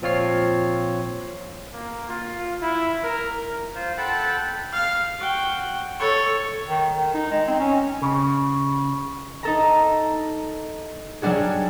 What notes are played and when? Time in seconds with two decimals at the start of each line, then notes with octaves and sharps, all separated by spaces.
0.02 A#2 F3 C4 F4 C#5 C7
1.72 A#3
2.08 F4
2.62 E4
3.03 A#4
3.75 F4 C5
3.98 A4 F#5 G5 A5 B5
4.73 F5
5.20 F#4 G5
5.99 A4 C#5
6.68 D#3
6.94 D#3
7.14 D#4
7.30 G#3
7.47 C4
7.59 C#4
8.02 C#3
9.43 D#4 A4 A#5
11.22 F#3 G3 D4 F#4 G#4